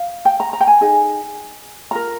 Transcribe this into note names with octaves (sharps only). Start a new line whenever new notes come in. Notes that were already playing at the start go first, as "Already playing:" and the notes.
Already playing: F5
G5
A#5
A#5
G5
G#5
D#4 G#4
F4 A#4 A#5